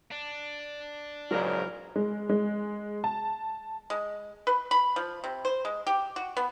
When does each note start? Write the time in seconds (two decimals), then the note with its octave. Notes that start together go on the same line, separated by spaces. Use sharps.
0.12 D4
1.31 A#1 G#2 C#3 E3 F#3 F4 A#4 D5
1.96 G#3
2.29 G#3
3.04 A5
3.90 G#3
4.47 B4
4.71 B5
4.96 F3
5.24 C3
5.45 C5
5.65 G#3
5.87 G4
6.16 F#4
6.37 B3